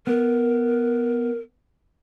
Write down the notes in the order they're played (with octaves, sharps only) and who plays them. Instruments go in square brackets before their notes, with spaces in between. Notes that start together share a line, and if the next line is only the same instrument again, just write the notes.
[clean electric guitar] B3 [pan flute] A#4